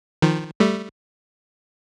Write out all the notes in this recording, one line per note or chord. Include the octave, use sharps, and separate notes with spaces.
D#3 F3
G3 A3